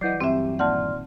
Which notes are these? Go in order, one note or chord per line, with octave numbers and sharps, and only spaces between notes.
E3 F#3 D5 D#5 F#5 G6 C7
G2 E3 F#3 C4 G4 B4 E5
A#2 D#3 D5 F#5 A5 C6 F6